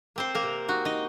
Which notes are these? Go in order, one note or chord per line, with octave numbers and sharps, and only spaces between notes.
A#3 C4 C5
A#3 A#4
C3
D#4 F#4
D#4 D#5